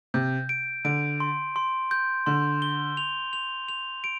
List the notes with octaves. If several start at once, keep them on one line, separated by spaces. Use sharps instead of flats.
C3 G6
D7
D3 D7
C6
C6
G6
D3 C6
G7
F7
F7
F7
D7